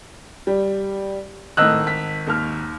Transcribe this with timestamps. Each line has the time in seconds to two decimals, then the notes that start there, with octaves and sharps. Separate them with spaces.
0.47 G3
1.57 G#1 A2 D#5 E6 F#6
1.87 B6
2.27 D#2 F6